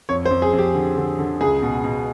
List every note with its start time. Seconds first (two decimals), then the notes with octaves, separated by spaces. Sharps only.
0.09 F2 C#5
0.25 C5
0.31 F2
0.42 G#4
0.53 F2
0.59 G4
0.75 D3
0.97 D3
1.19 D3
1.41 C#2 G#4
1.62 B2
1.84 B2